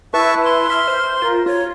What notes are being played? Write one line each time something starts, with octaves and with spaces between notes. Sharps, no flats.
E4 B4 E5 A5 C#6
C6
E5 F6
C5
F4 A#4
F4 C#5